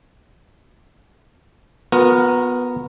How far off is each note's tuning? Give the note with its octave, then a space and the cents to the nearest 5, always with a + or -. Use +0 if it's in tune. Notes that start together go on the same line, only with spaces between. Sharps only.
B3 +0 F#4 -45 A#4 +0